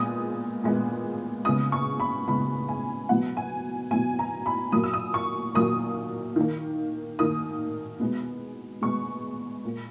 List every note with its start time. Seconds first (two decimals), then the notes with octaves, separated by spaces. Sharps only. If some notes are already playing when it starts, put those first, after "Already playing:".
Already playing: A#2 G#3 B3 D#6
0.64 A#2 G#3 B3
1.45 C#3 G#3 B3 D#6
1.72 C#6
2.00 B5
2.27 C#3 G#3 B3 B5
2.69 G#5
3.09 B2 F#3 B3 F#5
3.37 G#5
3.91 B2 F#3 B3 G#5
4.19 A#5
4.46 B5
4.72 A#2 F#3 A#3 D#6
4.83 E6
4.93 D#6
5.14 C#6
5.55 A#2 F#3 A#3 D#6
6.36 D#3 A#3
7.19 D#3 A#3 D#6
8.00 B2 G#3 B3
8.82 B2 G#3 B3 C#6
9.64 A#2 A#3